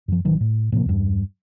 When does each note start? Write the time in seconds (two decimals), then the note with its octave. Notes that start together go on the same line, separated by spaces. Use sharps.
0.08 F#2 F3
0.25 A1 D#3 E3 F#3
0.40 A2
0.72 A2 C3 F3 A#3
0.86 E2 G2